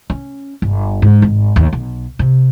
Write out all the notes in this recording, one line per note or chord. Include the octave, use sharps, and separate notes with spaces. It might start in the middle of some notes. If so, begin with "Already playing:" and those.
C#4
G1
G#2
G#1
D#2
B1
C3